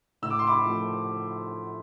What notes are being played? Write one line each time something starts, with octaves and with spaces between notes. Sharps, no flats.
A2 E6
D6
C6
B5 D6
F3 A3